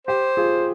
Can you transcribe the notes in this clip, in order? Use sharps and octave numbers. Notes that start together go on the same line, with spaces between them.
G4 C5
F4 G#4